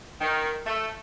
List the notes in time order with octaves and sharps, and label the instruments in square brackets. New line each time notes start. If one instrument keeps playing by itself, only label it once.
[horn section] D#3
A3